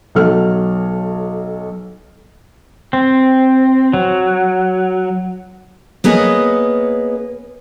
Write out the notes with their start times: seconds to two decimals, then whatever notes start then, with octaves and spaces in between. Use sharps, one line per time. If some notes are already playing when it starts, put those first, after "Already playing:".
0.15 B1 F#3 A4 F6
2.93 C4
3.93 F#3
6.04 A#3 B3 G#4 B4 C#5 D#5